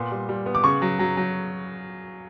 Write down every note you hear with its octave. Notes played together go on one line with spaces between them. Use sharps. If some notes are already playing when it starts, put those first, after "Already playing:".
Already playing: A#2 B3 C6
G3
G3
B3
D6
C#3 C#6
F#3
F#3
F#3